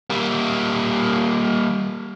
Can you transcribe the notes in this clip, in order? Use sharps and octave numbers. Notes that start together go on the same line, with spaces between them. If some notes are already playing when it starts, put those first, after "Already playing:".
G3 A#3